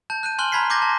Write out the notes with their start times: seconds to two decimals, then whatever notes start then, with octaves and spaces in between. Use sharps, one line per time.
0.10 A5 G6
0.23 F#6 G6 D#7
0.39 G#5 C6 F6 F#6 F#7 G7
0.52 A#5 B5 G#6 B6 C7
0.70 C6 D6 G6 G#6 A#6
0.82 A5